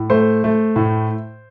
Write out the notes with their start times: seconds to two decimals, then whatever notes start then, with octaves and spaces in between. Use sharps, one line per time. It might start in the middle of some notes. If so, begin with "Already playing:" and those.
Already playing: A2
0.10 A3 C5
0.44 A3
0.76 A2